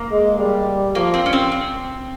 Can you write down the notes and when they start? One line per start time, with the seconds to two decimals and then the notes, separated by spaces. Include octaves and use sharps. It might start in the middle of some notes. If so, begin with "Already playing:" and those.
Already playing: A#3
0.12 G#3
0.39 G3
0.95 F3 A#3
1.14 C4
1.26 C#4
1.33 C4
1.52 C4